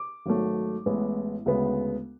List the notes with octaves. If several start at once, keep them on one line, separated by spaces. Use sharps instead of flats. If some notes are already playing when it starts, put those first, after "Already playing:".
Already playing: D6
G#1 G#2 F#3 A3
A1 A2 G#3 B3
D2 C#3 G#3 B3